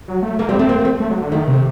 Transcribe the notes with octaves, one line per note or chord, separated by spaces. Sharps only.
F#3
A3
A3 A#3
G3 C4
A3 C4
A#3
A3
A3
F#3
D3
D#3 A3
C3